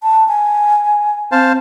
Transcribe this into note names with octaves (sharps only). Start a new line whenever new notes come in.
A5
G#5
C4 C5 F5 A5